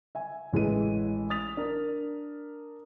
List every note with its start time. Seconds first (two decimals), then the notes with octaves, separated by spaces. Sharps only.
0.15 E5 G#5
0.53 A1 E3 G#3 A3 E4 D#7
1.30 D#6 A6 B6 F7
1.57 D4 A#4